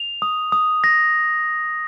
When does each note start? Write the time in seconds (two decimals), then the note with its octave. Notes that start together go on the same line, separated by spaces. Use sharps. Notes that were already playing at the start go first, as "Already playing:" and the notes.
Already playing: F7
0.22 D#6
0.52 D#6
0.84 A#6